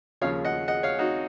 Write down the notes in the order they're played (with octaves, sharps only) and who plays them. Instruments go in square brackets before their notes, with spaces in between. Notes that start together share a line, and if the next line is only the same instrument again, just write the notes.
[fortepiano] D#2 C#3 F3 C#5 F5
D#5 F#5
D#5 F#5
C#5 F5
D#4 F#4